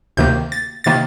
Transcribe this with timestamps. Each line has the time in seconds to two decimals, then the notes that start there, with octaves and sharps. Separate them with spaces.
0.17 D2 C3 D#3 A#3 G6
0.52 A6
0.84 C3 D#3 A#3 A6